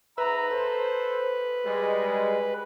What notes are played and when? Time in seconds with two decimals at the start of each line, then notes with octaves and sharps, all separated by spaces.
0.18 G#2 B4 E5 A#5
0.51 A4 C5
1.66 G3 G#3